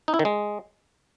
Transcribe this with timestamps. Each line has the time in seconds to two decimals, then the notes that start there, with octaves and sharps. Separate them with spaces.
0.08 D#4
0.14 E4
0.19 D#3
0.25 G#3